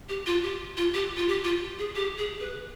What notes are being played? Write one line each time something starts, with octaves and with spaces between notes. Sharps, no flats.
G4
F4
G4
F4
G4
F4
G4
F4
G#4
G4
G#4
B4